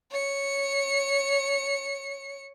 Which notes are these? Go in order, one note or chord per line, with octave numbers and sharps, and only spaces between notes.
C#5 C#7